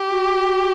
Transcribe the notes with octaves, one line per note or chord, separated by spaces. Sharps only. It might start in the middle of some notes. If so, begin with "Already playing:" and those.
Already playing: G4
F#4